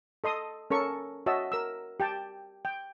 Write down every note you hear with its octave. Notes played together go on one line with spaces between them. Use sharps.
A4 D#5 C6 D#6
C#4 A4 A#4 C#6
F#4 C#5 D#5 E5 A5 E6
A#4 E6
G4 G5 A5
G5